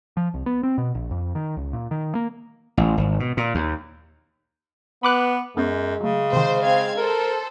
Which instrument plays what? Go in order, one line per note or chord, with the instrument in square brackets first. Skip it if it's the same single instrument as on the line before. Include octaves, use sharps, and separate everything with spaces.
[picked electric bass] F3
C2
B3
C4
B2
A#1
F2
D#3
C#2
A#2
D#3
A#3
[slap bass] A1
G#1
B2
A#2
D#2
[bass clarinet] B3 [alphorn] B4 [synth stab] B5 D6 F#6
[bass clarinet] F#2 [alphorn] G#3 [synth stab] B3 C#4
[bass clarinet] C#3 [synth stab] F#3 A3
[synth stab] C3 D#3 [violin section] C5
[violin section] C4 F5 G#6
[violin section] A4 C5 [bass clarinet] A#4